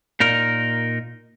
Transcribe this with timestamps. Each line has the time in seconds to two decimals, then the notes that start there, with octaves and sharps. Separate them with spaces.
0.20 A#2 D#4 A#4